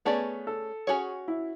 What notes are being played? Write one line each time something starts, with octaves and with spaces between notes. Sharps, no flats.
A3 B3 C#4 G#4 D5
A4
C#4 F#4 G#4 C#5
E4